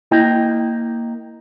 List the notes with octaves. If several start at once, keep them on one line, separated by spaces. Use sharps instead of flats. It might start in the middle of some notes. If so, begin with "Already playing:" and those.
A#3 E4 D#5 G5